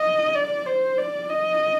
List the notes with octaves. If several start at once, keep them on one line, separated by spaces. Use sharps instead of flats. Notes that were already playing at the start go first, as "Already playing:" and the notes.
Already playing: D#5
D5
C5
D5
D#5